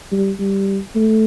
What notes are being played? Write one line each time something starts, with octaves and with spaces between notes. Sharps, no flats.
G3
G3
A3